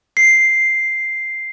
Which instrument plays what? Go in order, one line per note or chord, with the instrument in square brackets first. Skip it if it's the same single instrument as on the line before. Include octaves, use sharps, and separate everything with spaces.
[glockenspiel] C7